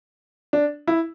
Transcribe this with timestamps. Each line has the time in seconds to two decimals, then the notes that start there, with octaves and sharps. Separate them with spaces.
0.53 D4
0.87 E4